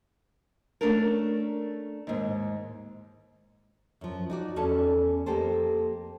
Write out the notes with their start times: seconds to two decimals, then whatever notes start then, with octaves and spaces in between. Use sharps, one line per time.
0.81 A3 C#4 D4 A4 A#4
2.07 D#2 G#2
4.01 F#2 F3
4.30 D#4 F#4 D5
4.56 E2 C#4 A4 A5
5.26 F2 A#3 G4 A4 C5